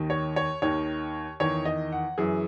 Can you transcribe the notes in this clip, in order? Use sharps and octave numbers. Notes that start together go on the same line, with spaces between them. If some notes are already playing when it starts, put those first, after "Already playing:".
Already playing: D#2 D#3
C#5
C#5
D#2 D#3 C#5
E2 D#3 C#5
D#5
F#5
F#2 E3 G#4